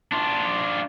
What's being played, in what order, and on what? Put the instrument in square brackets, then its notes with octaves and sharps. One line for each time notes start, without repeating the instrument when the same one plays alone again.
[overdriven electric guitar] D4 F4